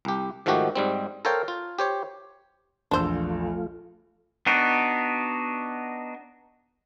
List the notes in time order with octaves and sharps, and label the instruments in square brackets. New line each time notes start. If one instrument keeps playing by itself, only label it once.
[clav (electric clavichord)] C2 G4
G#2 D#3 F3 A3 F#4 G4
G#2 G3 C4
A4 A#4 C5 C#5 F5 G5
F4
G4 C5 C#5
[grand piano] A#1 E2 E6 [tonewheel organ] F3 A3 F4 [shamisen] D4 C5
[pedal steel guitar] B3 D4 D#4 F#4